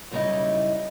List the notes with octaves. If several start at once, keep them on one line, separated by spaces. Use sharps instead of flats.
F#2 C#3 G3 D#4 E4 D#5